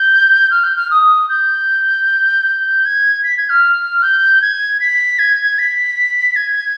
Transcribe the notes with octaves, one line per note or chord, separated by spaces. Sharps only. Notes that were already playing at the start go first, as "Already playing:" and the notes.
Already playing: G6
F6
G6
F6
D#6
G6
G#6
B6
G#6
F6
G6
G#6
B6
G#6
B6
G#6